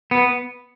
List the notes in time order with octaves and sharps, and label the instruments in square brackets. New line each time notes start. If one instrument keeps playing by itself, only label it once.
[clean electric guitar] B3